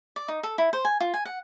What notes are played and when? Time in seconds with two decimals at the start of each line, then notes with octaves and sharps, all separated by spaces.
0.16 D5
0.28 D#4
0.43 A4
0.58 E4
0.73 C5
0.85 G#5
1.00 F4
1.14 G#5
1.25 F#5